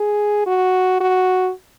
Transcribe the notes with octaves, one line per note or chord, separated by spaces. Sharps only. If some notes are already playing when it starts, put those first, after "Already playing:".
Already playing: G#4
F#4
F#4